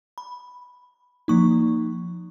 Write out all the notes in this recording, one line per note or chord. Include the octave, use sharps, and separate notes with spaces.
B5
F3 A#3 D#4 C#6